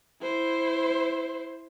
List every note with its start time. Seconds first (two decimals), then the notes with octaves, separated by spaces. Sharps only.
0.22 E4 C5